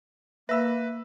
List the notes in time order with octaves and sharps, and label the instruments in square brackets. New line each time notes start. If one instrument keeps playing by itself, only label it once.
[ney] A#3 [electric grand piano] B4 E6 [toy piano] E5 F5 B5